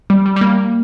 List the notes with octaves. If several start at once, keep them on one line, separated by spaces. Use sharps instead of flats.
G3
G3
G3
A#3